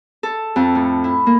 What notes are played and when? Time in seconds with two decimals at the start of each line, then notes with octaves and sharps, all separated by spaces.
0.23 A4
0.56 F2
0.75 A2
1.04 E4
1.26 A#3